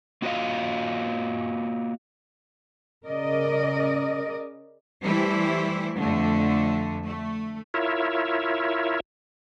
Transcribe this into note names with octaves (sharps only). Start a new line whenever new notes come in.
A#3 F4 F#4 A4 D#5 F5
C#3 A#4 D5 D#5
E3 G3 A3 E4 G4 C5
F2 D3 A3
A3
E4 F4 A#4 C#5 E5